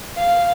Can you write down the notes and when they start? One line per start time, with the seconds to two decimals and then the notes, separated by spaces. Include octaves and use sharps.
0.17 F5